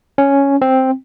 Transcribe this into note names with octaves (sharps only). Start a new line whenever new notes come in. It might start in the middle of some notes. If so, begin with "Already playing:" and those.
C#4
C4